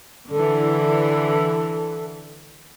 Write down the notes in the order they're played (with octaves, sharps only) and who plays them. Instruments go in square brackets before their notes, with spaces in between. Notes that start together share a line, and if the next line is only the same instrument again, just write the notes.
[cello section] D3 E3 [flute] A4